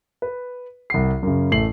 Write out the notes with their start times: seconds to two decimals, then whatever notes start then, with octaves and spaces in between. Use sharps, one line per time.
0.22 B4
0.90 C2 F#5 C7
1.23 F#2 C#3
1.52 A1 A3 C7 F#7